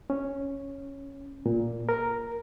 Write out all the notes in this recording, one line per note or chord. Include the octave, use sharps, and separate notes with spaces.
C#4
A#2
A#4